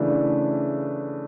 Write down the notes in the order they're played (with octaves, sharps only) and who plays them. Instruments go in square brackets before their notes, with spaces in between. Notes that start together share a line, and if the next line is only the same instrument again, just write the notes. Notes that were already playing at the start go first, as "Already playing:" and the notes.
Already playing: [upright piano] C#3 E3 A3 D4